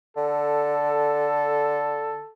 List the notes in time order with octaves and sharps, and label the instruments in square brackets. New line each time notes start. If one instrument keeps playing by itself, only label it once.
[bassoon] D3 [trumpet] A4